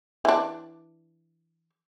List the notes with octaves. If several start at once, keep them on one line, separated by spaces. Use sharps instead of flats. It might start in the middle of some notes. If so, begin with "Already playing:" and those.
E3 D4